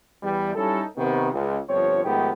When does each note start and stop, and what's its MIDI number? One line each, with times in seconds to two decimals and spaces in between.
0.23 0.55 40
0.23 0.55 55
0.56 0.83 55
0.56 0.83 61
0.56 0.83 63
0.56 0.83 64
0.56 0.83 69
0.97 1.29 48
0.97 1.29 51
0.97 1.29 59
1.33 1.58 37
1.69 2.01 31
1.69 2.01 43
1.69 2.01 53
1.69 2.01 60
1.69 2.01 73
2.04 2.31 44
2.04 2.31 51
2.04 2.31 53
2.04 2.31 57
2.04 2.31 59
2.04 2.31 67